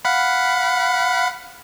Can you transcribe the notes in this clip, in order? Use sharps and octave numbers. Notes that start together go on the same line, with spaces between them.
F5 F#5 B5